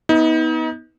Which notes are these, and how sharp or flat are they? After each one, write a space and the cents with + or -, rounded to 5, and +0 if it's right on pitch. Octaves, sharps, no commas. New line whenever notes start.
B3 +0 D#4 +35